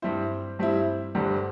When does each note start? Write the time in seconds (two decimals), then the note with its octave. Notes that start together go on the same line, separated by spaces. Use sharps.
0.02 G2 G3 C4 E4 C5
0.59 G2 G3 C4 E4
1.15 G1 G2 D3 G3 C5